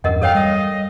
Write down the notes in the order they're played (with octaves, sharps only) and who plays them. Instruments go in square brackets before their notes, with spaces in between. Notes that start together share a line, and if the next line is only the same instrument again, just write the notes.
[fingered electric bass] E2 G2 [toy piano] A#4 D#5 F#5
[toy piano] A4 C#5 G5 [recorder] F5
[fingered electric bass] G3 [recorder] D#5